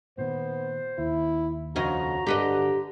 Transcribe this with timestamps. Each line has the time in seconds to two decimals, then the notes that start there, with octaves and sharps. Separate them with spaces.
0.18 A#2 D#3 B3 C5
0.98 D#2 E4
1.76 F2 C#3 F#4 D#5 A#5
2.26 G1 D3 G4 B4 D#5